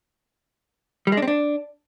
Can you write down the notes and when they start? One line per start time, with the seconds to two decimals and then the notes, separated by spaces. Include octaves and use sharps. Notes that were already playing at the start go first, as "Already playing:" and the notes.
1.07 G3
1.12 G#3
1.17 D4
1.22 C4
1.28 D4